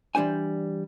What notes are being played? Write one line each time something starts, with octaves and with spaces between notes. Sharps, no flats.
E3 G3 D4 C5 G#5